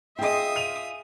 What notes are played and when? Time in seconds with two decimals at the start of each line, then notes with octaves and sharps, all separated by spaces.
0.19 F4 G#4 D#5 E5 G5 C6 D#6
0.56 D#7 F7